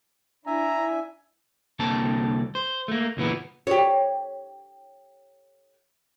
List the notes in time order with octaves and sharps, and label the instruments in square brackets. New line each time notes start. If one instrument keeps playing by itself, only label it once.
[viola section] D4 E4 [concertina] E5 G#5 [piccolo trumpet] A#5
[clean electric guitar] C2 D3 A#3 C4 A4 A5
C5
A3 A#3
C#2 A#2 E3 B3
[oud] G4 C#5